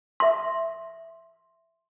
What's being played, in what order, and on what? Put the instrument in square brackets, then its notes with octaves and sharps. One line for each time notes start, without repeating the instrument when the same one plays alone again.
[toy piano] E5 C6